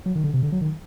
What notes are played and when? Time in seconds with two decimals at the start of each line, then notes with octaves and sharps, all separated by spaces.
0.06 F#3
0.15 D#3
0.24 D3
0.34 C3
0.43 D3
0.52 F#3
0.61 D#3